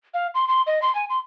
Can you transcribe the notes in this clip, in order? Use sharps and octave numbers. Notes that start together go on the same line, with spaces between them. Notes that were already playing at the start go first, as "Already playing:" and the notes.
F5
C6
C6
D#5
C6
G#5
C6